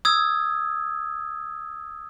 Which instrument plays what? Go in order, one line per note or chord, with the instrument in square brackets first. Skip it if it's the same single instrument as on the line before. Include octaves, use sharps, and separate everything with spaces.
[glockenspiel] D#6 E6 G#6